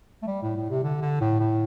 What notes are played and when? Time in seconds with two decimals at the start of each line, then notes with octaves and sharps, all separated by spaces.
0.22 A3
0.27 G3
0.42 A2
0.56 A2
0.70 C3
0.83 D3
1.01 D3
1.20 A2
1.39 A2